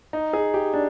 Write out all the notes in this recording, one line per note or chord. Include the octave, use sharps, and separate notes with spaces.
D#4
G#4
G4
D4